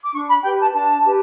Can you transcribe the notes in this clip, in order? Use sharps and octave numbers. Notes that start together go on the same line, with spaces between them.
D6
D4 C#6
B5
G4 B4 G5
A5
D4 A5
G4 B4